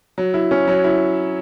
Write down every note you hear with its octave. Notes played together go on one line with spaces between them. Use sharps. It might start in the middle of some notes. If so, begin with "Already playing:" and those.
F#3
E4
C#4
F#3
E4